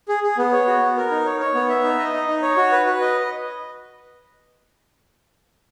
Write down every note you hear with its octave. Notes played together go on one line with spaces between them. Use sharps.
G#4
G#4
B3
C#5
F#4
B3
A#4
D#4
C#5
C#5
B3
E5
D#4
D#5
D#4
D#4
C#5
F#4
B4
B4
D#5